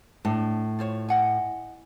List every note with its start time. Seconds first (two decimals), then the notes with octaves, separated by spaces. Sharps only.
0.25 A2 D4
0.79 F4 C5 C#5
1.09 D#5 F#5 G#5